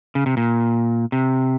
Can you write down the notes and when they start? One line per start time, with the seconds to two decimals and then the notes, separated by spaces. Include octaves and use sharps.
0.15 C#3
0.26 C3
0.37 A#2
1.12 C3